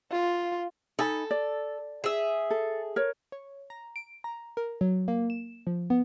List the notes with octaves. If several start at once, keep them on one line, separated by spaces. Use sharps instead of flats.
F4
D#4 A4 G#5 B5
D5
G#4 E5
A4
A#4 C#5
C#5
A#5
D7
A#5
A#4
F#3
A#3
E7
F3
B3